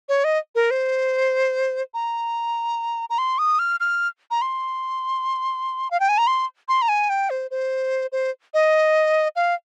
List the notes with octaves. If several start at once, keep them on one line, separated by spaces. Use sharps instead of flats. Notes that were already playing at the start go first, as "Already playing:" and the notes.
C#5
D#5
A#4
C5
A#5
A#5
C6
D#6
F6
F6
A#5
C6
F5
G5
G#5
A#5
C6
C6
A#5
G#5
G5
C5
C5
C5
D#5
F5